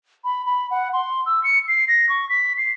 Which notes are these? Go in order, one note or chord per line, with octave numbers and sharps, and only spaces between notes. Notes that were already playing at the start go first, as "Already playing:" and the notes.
B5
B5
F#5
C6
E6
C#7
C7
A#6
C#6
B6
C7